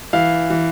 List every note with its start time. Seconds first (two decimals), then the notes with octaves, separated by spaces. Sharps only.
0.13 E3 F5
0.50 E3